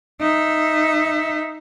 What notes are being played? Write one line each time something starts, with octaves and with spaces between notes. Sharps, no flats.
D#4 E5